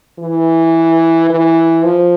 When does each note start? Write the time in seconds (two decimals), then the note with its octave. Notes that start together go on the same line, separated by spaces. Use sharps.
0.19 E3
1.30 E3
1.85 F3